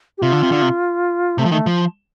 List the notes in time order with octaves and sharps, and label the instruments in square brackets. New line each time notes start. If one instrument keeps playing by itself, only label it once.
[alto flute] G4
[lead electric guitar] C3 [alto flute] F4
[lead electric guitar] D3
C3
D3
C3
[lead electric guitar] C3 [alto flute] A3
[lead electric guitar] F3
[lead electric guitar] D#3 [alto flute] A3
[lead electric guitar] F3